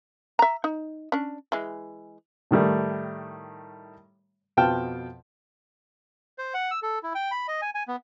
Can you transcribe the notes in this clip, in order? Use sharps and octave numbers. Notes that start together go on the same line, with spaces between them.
E5 A#5
D#4
C#4 D4
E3 G#3
A2 D#3 G3 A3
F2 B2 F4 G5 A5 F6
C5
F#5
E6
A4
E4
G5
B5
D#5
G#5
G#5
B3